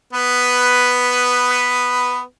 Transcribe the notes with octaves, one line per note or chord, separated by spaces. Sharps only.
B3 B4